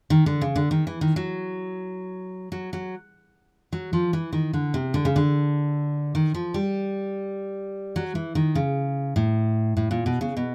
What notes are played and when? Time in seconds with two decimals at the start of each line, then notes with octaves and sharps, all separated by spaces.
0.10 D#3
0.26 D3
0.41 C#3
0.56 D3
0.71 D#3
0.87 E3
1.01 D#3
1.16 F#3
2.52 F#3
2.73 F#3
3.73 F#3
3.93 F3
4.13 E3
4.33 D#3
4.53 D3
4.74 C3
4.94 D3
5.05 C#3
5.16 D3
6.15 D#3
6.34 F3
6.54 G3
7.96 F#3
8.15 E3
8.35 D#3
8.55 C#3
9.16 A2
9.77 A2
9.91 A#2
10.06 B2
10.21 C#3
10.37 B2